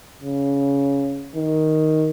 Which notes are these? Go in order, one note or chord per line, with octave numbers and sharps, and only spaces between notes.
C#3
D#3